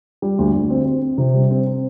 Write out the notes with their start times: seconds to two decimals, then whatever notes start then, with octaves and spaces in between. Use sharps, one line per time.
0.22 G3
0.39 D2
0.54 D2
0.70 C4
0.86 C4
1.02 C4
1.18 C3
1.34 G3
1.50 C4
1.66 C4